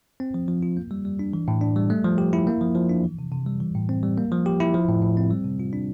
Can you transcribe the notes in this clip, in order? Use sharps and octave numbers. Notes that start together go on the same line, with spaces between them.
C4
F3
F3
F4
A#3
G3
G3
D4
E3
A2
D4
G3
A3
F3
G4
E4
A#3
F3
F3
D4
E3
C3
C3
G3
E3
A2
C4
G3
A#3
F3
G4
E4
F3
A2
A2
C4
G3
C3
F4
D4